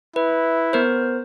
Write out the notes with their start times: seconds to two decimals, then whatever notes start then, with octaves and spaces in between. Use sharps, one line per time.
0.16 E4 B4
0.73 B3 A#4 C5